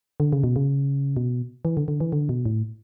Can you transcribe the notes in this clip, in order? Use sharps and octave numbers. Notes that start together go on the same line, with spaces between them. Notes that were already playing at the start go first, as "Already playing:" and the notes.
D3
C#3
B2
C#3
B2
E3
D3
D3
E3
D3
B2
A2